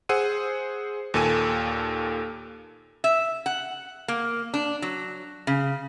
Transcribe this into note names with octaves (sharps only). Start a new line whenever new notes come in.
G#4 C5 F#5 E6 D#7
D#2 A#2 A4 G#5 D#7
E5
F#5
A#3
D4
F#3
C#3